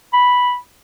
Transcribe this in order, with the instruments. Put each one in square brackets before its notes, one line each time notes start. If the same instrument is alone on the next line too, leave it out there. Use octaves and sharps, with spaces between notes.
[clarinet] B5